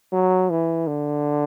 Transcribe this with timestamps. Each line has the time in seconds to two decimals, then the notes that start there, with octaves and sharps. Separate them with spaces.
0.12 F#3
0.50 E3
0.87 D3